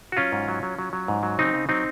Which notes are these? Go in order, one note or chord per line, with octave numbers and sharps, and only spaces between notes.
F#4
F#3 C#4 F4
G#2
F#3
F#3
F#3
F#3
G#2
F#3
C#3 C4 D#4
C#3
F#3 C4 D#4